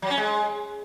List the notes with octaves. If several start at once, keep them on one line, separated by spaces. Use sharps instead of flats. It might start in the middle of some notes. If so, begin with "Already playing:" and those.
F#3
C#4
G#3